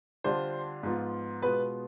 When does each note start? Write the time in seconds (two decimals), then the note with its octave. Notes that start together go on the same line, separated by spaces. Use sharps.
0.24 D3 G3 D4 F4 C5
0.83 G#2 F3 B3 F4
1.42 B2 G#3 B3 F4 B4